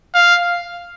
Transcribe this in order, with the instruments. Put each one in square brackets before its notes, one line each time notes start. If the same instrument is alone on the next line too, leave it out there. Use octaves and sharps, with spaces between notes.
[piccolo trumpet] F5